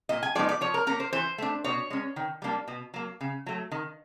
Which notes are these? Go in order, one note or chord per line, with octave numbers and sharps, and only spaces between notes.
A#2 D#5
G#5
F3 G#3 B3 D#4 D5
D5
F3 C#5
A#4
A#3 C#4 A#4
C5
E3 C5
A3 D4
B2 C#5
G#3 C#4
D#3
G3 A#3 D4
B2
F#3 A#3
C#3
F#3 A3
D#3